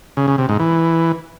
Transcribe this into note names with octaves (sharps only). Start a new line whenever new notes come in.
C#3
C#3
C3
G#2
E3